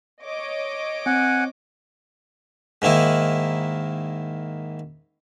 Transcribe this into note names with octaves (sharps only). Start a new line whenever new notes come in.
C#5 D#5 D6
C4 F#5 G#5
G#2 D#3 A#3 E4